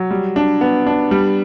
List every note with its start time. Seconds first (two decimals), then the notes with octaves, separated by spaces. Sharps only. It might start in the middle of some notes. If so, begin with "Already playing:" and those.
Already playing: F#3
0.11 G3
0.36 D4
0.61 B3
0.87 D4
1.11 G3